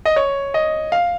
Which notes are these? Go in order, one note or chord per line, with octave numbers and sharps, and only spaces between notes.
D#5
C#5
D#5
F5